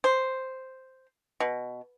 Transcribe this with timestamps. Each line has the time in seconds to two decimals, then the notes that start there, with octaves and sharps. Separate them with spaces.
0.04 C5
1.40 B2